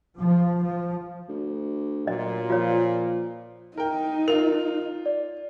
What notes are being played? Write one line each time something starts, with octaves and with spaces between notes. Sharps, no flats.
F3
F3
D2
A#2 F#3 D#5
F3 F4 C#5
D#4 A#4 G5
F4 A#4 F7
D5